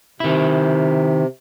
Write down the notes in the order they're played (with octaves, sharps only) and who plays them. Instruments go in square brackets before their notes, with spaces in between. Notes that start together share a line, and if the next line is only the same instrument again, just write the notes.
[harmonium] C3 [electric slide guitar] D#3 E4